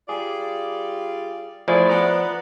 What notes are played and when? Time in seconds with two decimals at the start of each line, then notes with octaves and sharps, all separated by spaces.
0.09 G3 F4 G#4 D5
1.68 F3 A3 E4 G#4 D5
1.89 B3 B4 F#5 A#5